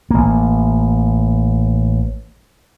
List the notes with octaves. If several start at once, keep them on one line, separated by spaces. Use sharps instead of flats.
A1 A#3